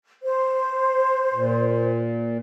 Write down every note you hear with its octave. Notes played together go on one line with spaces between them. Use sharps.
C5
A#2